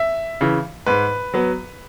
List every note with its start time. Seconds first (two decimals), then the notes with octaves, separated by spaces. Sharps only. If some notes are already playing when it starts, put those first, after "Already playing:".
Already playing: E5
0.41 C#3 E3
0.86 G#2 B4
1.34 F#3 B3